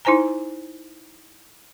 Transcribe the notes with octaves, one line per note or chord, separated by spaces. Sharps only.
D#4 E4 C5 G#5 A#5